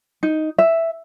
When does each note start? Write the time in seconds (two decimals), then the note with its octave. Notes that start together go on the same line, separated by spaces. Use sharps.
0.23 D#4
0.59 E5